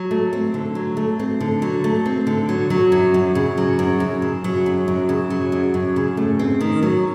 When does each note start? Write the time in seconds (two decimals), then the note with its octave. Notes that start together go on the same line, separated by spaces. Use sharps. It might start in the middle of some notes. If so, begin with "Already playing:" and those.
Already playing: F#3
0.11 A3
0.33 C4
0.54 D3
0.75 F#3
0.97 A3
1.19 C4
1.40 D3
1.62 F#3
1.84 A3
2.06 C4
2.27 D3
2.49 F#3
2.70 F#3
2.92 F#2
3.14 F#2
3.35 C#3
3.57 F#3
3.79 F#2
4.00 F#2
4.22 C#3
4.44 F#3
4.66 F#2
4.88 F#2
5.09 C#3
5.30 F#3
5.52 F#2
5.74 F#2
5.96 C#3
6.17 A3
6.39 C4
6.61 D#3
6.83 F#3